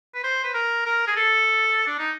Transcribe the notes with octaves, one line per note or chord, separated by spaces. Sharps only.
B4
C5
B4
A#4
A#4
G#4
A4
D4
D#4